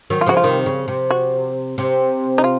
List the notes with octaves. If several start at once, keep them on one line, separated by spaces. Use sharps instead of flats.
D#3 F#3
F4
C#3 F3 F#4
F4
C3 D#3
C#3
C3
F#4
C3
D#4
F4